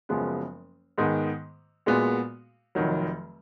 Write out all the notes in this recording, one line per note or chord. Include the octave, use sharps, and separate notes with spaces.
F#1 F#2 F3 G#3 B3
G#2 D#3 G#3 B3
A#2 G#3 B3 F#4
F1 F2 D#3 F#3